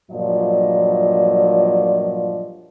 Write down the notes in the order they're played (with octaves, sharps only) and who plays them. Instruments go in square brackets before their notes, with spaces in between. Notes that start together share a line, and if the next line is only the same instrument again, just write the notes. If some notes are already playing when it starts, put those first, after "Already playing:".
[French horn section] G2 A#2 F3 F#3 D5 D#5